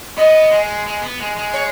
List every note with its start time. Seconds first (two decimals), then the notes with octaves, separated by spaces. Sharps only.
0.17 B3 D#5
0.52 G#3
0.86 G#3
1.02 B3
1.20 G#3
1.37 G#3
1.53 C#5